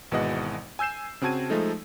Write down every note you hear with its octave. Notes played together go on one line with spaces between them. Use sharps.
G#1 B2 E3 G#3 D#5 F#5
G#5 E6 G6 C7 E7
C#3 C4 F#4 A5 G#6 D#7
F3 G#3 A3 D#4 A4